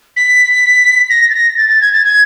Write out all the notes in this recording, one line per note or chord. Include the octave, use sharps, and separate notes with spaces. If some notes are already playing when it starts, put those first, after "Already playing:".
B6
A#6
A6
A#6
A6
A6
G#6
A6
G#6